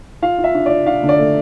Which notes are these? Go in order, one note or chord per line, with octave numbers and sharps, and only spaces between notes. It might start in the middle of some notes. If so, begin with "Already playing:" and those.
F4 F5
F4
E5
D4
D5
D4
D4 F5
D3
D5
A3